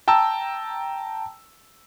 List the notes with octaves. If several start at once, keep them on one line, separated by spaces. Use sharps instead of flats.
G5 A5 A#5 E6